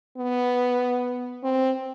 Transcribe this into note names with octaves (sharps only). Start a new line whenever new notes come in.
B3
C4